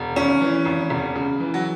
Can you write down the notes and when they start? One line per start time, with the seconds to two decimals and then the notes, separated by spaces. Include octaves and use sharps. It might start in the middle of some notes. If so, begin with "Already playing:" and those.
Already playing: E1
0.16 G#1 C#4
0.41 E3
0.65 G#1
0.90 E1
1.15 C#3
1.40 E3
1.54 F#3